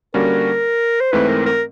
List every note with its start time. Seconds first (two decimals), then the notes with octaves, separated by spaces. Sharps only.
0.14 D3 G3 A#3 C#4 F#4 A#4
1.01 C5
1.12 G#2 E3 A3 C4 B4
1.29 A#4
1.46 A#4